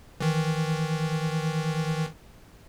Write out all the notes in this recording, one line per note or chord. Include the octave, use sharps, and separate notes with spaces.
D#3 E3